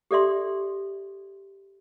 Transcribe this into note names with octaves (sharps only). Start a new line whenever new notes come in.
G4 A4 D5 E5 C6